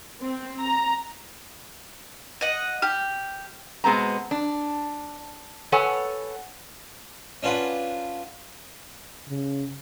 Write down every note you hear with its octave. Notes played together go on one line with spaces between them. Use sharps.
C4
A#5
D#5 F#5
G4 F6
B2 G#3 B3 C4 A#5
D4
A4 B4 C#5 F#5 G#5
C#4 D4 F4 B4 F#5
C#3